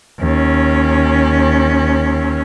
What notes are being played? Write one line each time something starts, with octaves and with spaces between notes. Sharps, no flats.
D#2 C#4